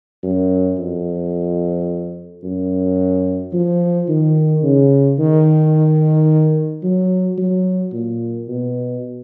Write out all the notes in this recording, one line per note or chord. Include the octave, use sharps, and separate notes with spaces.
F#2
F2
F#2
F3
D#3
C#3
D#3
F#3
F#3
A#2
B2